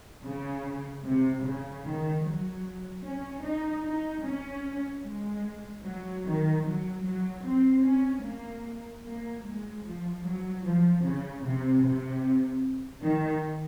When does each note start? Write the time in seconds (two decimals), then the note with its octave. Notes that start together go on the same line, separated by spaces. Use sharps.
0.25 C#3
1.05 C3
1.45 C#3
1.86 D#3
2.25 F#3
3.05 C#4
3.44 D#4
3.85 D#4
4.25 C#4
5.05 G#3
5.85 F#3
6.25 D#3
6.65 F#3
7.04 F#3
7.44 C4
7.84 C#4
8.24 A#3
9.05 A#3
9.45 G#3
9.84 F3
10.24 F#3
10.64 F3
11.05 C#3
11.44 C3
11.84 C3
13.03 D#3